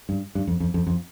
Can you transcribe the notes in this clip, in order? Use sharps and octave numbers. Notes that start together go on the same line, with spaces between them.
G2
G2
F2
F2
F2
F2